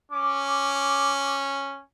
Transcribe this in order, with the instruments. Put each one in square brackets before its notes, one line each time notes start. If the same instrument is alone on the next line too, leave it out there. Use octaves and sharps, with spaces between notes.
[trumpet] C#4 [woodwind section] D6